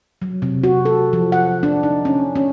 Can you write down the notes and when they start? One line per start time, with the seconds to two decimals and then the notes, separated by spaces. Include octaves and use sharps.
0.22 F#3
0.42 C3
0.64 F#4
0.85 A4
1.13 F3
1.32 F#5
1.63 D4
1.83 D#4
2.05 C#4
2.35 C#4